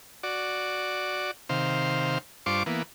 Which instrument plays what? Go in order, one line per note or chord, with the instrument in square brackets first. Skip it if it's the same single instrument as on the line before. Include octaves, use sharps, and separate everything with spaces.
[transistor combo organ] F#4 D5
C3 D#3 C5 F5
G2 D4 F4 C5 C#6 D6
E3 A#3 B3